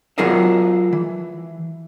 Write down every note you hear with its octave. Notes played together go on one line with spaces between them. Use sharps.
F#3 F4 G#4 A#4 D#5 E5
E3